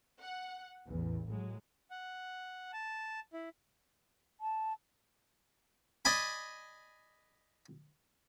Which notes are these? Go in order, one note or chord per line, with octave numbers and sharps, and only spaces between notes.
F#5
A1 E2
A2 F#3 G#3
F#5
A5
E4
A5
D5 D#5 G#5 B5